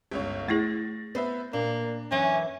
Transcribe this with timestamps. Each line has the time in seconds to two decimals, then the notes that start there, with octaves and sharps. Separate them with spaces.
0.11 G1 C#2 C#5
0.48 A3 E4 G#4 A6 A#6
1.15 B3 B4 C5 E5
1.53 A#2 A#3 D4
2.11 F#2 E3 F#3 C#4